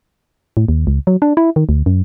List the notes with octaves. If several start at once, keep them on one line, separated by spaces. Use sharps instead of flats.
A2
D#2
C#2
F#3
D4
E4
D#3
D2
F#2